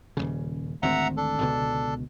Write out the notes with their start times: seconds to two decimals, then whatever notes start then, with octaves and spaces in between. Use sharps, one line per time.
0.17 D#1 A#1 C#3
0.83 G#1 D2 C4 E5 F#5 A#5
1.17 D4 A4
1.41 C#2 B2 D3